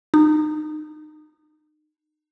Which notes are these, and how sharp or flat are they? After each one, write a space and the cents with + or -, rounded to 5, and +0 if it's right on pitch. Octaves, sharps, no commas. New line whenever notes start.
D#4 -30